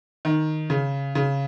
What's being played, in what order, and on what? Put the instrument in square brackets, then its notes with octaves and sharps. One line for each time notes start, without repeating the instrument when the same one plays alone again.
[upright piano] D#3
C#3
C#3